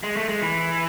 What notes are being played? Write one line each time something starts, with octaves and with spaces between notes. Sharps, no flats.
G#3
A3
G#3
E3